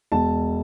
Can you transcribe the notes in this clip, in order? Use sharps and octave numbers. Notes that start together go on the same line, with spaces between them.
E1 A5